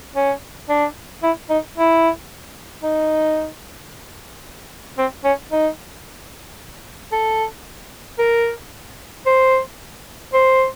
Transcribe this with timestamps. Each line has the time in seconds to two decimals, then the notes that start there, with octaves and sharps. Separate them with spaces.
0.16 C#4
0.69 D4
1.23 E4
1.50 D#4
1.77 E4
2.83 D#4
4.98 C4
5.24 C#4
5.52 D#4
7.12 A4
8.19 A#4
9.26 C5
10.33 C5